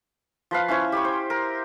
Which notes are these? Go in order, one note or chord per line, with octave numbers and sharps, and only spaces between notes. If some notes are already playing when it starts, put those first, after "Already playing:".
F3 B4 F5
C#4 E4 C5 C#5
G4 B5 C#6
C5
A#4